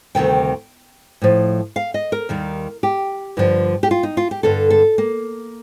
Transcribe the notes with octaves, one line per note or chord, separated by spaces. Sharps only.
D2 C3 D#3 G3 G5
A2 F3
F5
D#5
A#4
D#2 D#3 G3
G4
G2 D3 F3
G4
F4
D#4
F4
G4
G2 D3 G3 A4
A4
A#3